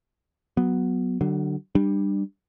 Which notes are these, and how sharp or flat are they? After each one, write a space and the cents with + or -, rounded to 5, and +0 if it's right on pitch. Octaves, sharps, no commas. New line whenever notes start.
F#3 +0 B3 +0
D3 +20 F#3 +40
G3 +10 D4 +25